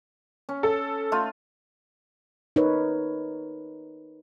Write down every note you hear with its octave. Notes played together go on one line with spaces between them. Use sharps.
C#4
A4
A3 F4
D#4 A#4 B4 C#5